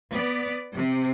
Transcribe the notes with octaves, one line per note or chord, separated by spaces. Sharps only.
B3 D5
C3